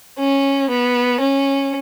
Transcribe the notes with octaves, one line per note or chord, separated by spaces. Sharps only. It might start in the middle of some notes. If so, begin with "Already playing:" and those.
C#4
B3
C#4